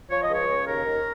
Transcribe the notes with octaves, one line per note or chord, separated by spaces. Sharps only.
F3 C#5
D#5
C#2 C#5
C#3
D#2 A#4
D#3